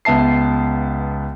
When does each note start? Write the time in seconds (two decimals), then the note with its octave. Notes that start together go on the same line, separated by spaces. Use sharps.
0.05 C#2 B3 E5 A5 C7